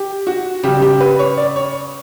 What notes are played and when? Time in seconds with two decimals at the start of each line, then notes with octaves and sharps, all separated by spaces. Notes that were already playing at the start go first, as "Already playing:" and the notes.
Already playing: G4
0.27 F#4
0.63 C#3 G3 G4
0.82 G4
1.01 B4
1.19 C#5
1.37 D5
1.56 C#5